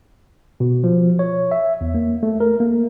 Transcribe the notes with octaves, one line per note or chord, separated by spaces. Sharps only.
B2
F3
C#5
E5
E2
A#3
A3
A#4
A#3